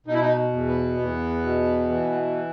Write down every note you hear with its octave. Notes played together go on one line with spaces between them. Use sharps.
B2 D#4
E4
D#4
E2
B3
E2
B2
E3